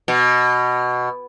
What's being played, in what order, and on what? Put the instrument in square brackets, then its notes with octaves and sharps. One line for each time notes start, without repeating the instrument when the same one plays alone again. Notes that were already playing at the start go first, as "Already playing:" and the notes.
[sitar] B2